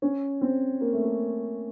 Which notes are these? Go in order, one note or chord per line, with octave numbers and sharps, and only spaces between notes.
C#4
C4
A#3
A3
A#3